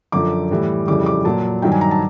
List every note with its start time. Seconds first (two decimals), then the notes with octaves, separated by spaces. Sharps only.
0.12 F#2 D3 F3 D6
0.50 A2 E3 G3
0.87 F2 C#3 E3 G3 D6
1.06 D6
1.25 A#2 F#3 A5
1.62 G2 D#3 F#3 G5
1.72 G#5
1.81 A#5
1.91 A5